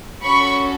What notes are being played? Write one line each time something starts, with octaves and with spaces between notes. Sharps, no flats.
C#4 F#4 A4 B5 C#6